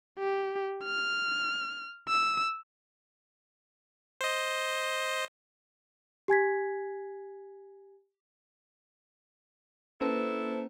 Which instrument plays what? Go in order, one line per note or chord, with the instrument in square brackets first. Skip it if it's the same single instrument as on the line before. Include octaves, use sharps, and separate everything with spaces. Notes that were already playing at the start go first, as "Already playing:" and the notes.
[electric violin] G4
F6
E6
[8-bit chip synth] C5 D#5
[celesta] G4 G#5 G#6 B6
[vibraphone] A#3 [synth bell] C#4 B4 [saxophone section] D4 E4 A4 [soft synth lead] C5